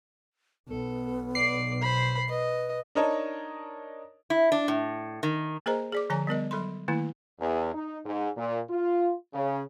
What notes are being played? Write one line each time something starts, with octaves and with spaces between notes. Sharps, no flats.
B1 B3 A4
D5 C7
C5 B5
B4 D#5
D4 D#4 A#4 C#5 D#5 A5
E4
D4
A2
D#3
A#3 G#4 A#4 C5 D#5 A#5
G#4 D5 D6
D3 F3 C#5 G#5 A#5
G3 B3 A#4 D#5
F#3 A4 B5 C6
D#3 A3 A#3 E4
E2
D#4
G#2
A#2
F4
C#3